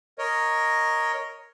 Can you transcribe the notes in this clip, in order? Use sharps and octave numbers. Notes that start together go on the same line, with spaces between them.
A#4 C#5 D#5